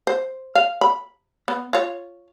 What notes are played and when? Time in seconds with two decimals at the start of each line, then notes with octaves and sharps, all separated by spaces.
0.07 C5
0.55 F5
0.81 B5
1.48 B3
1.73 F4 C#5